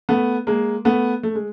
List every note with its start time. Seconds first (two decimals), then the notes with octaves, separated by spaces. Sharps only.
0.09 A3 B3
0.47 G#3 A#3
0.85 A3 B3
1.23 A3
1.35 G#3